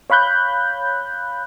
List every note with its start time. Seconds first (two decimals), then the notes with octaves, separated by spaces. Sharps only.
0.10 C#5 F5 B5 F#6 G6